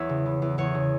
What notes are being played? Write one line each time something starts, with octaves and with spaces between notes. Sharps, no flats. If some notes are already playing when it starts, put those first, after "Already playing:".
Already playing: E2 E3 C#5 E5
C#3
E3
E2
E2 C#5
C#3